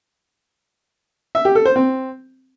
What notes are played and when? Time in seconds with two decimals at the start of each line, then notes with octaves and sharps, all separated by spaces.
1.35 E5
1.45 G4
1.55 A4
1.65 C5
1.76 C4